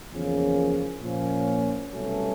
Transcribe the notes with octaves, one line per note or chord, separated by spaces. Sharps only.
E2 C#3 F3 A#3 C#4
A#2 F3 A#3 C#4
C2 B2 F#3 A3 C#4